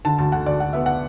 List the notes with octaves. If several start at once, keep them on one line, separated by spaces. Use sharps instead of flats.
D3 A5
D2 A5
D2 F#5
D2 D5
D2 F#5
B3 E5
F#5